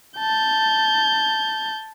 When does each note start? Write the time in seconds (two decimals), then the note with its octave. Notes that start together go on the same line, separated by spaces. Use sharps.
0.20 A5 G6